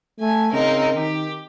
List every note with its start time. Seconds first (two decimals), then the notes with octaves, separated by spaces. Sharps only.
0.20 A3 G#5
0.53 C#3 C4 D#4 A#4
0.94 D#3 G4